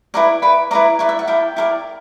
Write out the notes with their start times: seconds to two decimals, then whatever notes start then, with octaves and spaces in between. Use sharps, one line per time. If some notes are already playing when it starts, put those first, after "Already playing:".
0.14 E4 B4 D5 A#5
0.42 E4 B4 D5 B5
0.71 E4 B4 D5 A#5
0.99 E4 B4 D5
1.09 E5
1.19 F#5
1.27 E4 A#4 D5 G5
1.56 E4 A#4 D5